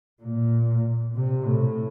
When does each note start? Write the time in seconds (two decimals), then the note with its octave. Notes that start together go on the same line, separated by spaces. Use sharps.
0.22 A#2
1.15 C3
1.46 A2